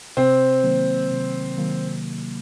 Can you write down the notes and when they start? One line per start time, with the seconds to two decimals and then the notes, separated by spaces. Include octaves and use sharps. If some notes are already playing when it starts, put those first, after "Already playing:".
0.17 C3 C4
0.63 D#3 F#3 A#3
1.11 C3
1.57 D#3 F#3 A#3